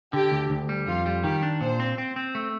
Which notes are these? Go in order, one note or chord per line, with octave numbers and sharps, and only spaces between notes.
D3 G4
D2
D2
G3
F2 F4
G3
D#3 G4
D4
A#2 C5
C4
C4
C4
A3